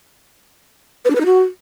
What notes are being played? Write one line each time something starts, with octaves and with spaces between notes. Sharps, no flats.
B4
D4
B4
D#4
F#4